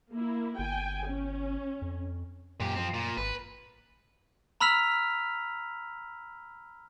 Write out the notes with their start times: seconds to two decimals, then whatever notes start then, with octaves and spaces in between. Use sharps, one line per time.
0.12 A#3 E4
0.58 G1 G5 G#5
1.09 C#4
1.82 F2
2.60 F#2 A#2 G4
2.75 F3 C4
2.94 A#2
3.18 G#1 B4
4.61 A#5 B5 E6 F6 B6 F7